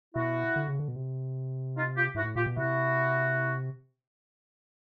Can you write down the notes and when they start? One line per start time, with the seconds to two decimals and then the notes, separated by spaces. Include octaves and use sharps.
0.15 B2 E4 F#4
0.56 D3
0.68 C#3
0.79 D3
0.88 B2
0.96 C3
1.77 D#4 F4
1.97 F4 G4
2.15 G#2 E4 F#4
2.24 A2
2.36 A#2 F4 G4
2.46 B2
2.57 C3 E4 F#4